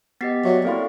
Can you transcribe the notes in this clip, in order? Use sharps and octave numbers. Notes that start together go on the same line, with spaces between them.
B3 G4 D#5 A6 B6 C7
F#3 D5 E5 C#6
A#3 C4 E4 A4 F5 C6